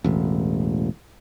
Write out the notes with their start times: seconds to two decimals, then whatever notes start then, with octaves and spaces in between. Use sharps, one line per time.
0.04 E1 A1